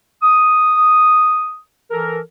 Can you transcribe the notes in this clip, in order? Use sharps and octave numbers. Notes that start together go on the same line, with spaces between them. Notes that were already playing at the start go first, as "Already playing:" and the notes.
D#6
E3 A4 A#4